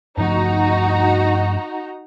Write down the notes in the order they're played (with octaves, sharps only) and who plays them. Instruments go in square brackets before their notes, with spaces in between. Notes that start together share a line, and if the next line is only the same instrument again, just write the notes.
[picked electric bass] G2 F3 A3 [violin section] D#4 F#4 A#5